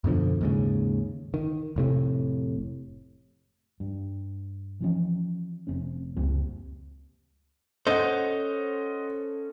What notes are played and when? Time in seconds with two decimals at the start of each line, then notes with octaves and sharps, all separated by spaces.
0.04 F#2 B2 D3 F3
0.41 D#2 G#2 C#3
1.34 D#3
1.76 F1 A2 C3
3.80 G2
4.81 E3 F3 C#4
5.67 F1 C4 C#4
6.16 C#2 F#2 G3 C4
7.87 C#4 A4 C5 D#5 F#5